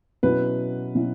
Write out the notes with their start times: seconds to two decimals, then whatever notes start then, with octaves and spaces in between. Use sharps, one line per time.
0.23 B2 F#3 C#4 E4 B4
0.95 B2 F#3 C#4 E4